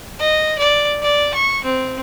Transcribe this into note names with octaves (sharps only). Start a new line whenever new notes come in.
D#5
D5
D5
C#6
C4